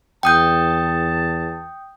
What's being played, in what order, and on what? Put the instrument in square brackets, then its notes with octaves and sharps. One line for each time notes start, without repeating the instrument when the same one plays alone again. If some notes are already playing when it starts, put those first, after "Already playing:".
[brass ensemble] E2 A5 [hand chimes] G5 D#6 G6